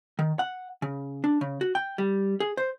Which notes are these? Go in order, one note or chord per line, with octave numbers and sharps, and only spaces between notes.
D#3
F#5
C#3
D4
C#3
F#4
G5
G3
G#4
C5